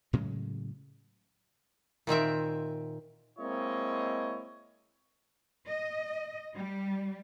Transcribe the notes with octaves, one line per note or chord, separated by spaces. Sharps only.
A2 C#3 F#3 G#3
A#2 D#3 C4 E5
G#3 A#3 C4 E4 C#5 D#5
D#5
G3